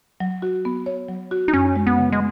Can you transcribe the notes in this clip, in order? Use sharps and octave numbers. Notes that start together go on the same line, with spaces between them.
F#3
F#4
B3
C#5
F#3
F#4
D#4
F#2 C#4
G#3
B3
C#3
G#3